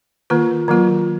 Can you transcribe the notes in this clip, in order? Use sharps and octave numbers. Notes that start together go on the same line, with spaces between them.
D#3 A#3 F4 B4
D#3 F#3 A#3 F4